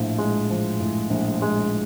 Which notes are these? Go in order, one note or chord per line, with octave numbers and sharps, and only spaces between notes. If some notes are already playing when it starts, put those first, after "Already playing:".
Already playing: A#1 A2 F3
G#3
F3
A2
A#1
G#3